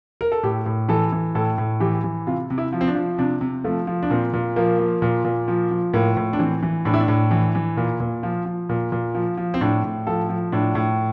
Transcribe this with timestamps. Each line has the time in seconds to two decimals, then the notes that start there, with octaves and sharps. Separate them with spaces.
0.21 A#4
0.32 A4
0.43 A2 G4
0.66 A2
0.89 E3 A4
1.12 E3
1.35 A2 A4
1.58 A2
1.80 E3 G4
2.04 E3
2.27 C3 F4
2.50 C3
2.58 E4
2.72 F3
2.81 C4
2.88 D4
2.95 F3
3.18 C3 D4
3.41 C3
3.64 F3 A3
3.87 F3
4.03 D4
4.10 A#2 C4
4.33 A#2
4.56 F3 A#3
4.79 F3
5.02 A#2
5.24 A#2
5.48 F3
5.71 F3
5.94 A2 A#3
6.17 A2
6.33 D4
6.39 E3 C4
6.62 E3
6.85 A2 D4
6.94 E4
7.00 D4
7.08 A2
7.31 E3
7.55 E3
7.77 A#2
8.00 A#2
8.23 F3
8.45 F3
8.69 A#2
8.92 A#2
9.15 F3
9.37 F3
9.54 C4
9.61 A2 D4
9.84 A2
10.07 F3 A4
10.29 F3
10.52 A2 D4
10.75 A2